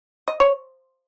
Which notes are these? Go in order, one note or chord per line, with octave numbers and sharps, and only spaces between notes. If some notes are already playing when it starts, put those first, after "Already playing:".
D#5
C#5